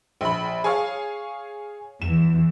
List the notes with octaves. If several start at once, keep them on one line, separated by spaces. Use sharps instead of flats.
A#1 B5
G#4 C#5 F5
E2 E3 E7